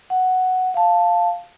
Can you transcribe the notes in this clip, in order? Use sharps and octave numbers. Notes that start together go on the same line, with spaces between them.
F#5
F5 A5